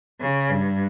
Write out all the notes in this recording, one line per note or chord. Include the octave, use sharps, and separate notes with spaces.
C#3
G2